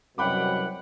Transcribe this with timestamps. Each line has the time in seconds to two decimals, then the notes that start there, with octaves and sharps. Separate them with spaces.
0.18 C2 F#2 B2 F#5 G5 B5 D6